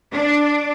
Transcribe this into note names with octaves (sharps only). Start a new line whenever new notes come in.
D4